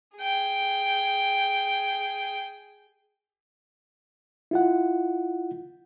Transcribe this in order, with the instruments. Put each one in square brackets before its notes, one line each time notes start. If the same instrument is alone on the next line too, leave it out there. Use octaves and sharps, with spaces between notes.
[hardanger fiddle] G#4 G5
[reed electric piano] E4 F4 F#5